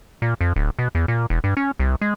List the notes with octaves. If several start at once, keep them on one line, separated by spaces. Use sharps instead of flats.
A#2
F2
D1
B2
E2
A#2
E1
G2
C#4
C2
G#3